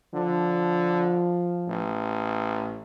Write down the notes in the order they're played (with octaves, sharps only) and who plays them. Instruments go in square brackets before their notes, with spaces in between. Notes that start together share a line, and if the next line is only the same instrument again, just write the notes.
[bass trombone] D3 [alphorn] F3
[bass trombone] A1